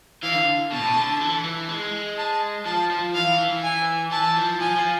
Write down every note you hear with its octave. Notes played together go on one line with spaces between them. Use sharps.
E3 F5
D3
B2 A5
A2
B2
D3
E3
E3
G#3
A5
F3 A5
F3
E3 F5
E3
G#5
E3 A5
F3
F3 G#5
F3